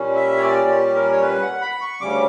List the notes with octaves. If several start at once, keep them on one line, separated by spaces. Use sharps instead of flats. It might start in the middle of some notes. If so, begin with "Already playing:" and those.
Already playing: A#2 G3 C#4
E5
C#5
D5
G4
A#4
C#5
B4
F#5
B5
C#6
D2 C#3 G3 C#4 D6